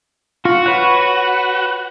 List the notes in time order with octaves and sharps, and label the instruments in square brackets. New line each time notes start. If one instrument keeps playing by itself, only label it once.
[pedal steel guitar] F4 [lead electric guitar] F#4
[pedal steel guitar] B4 C#5 F#5